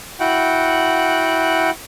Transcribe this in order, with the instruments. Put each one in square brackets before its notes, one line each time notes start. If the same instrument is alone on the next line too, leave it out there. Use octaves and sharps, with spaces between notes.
[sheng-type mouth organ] E4 F#4 F#5 G5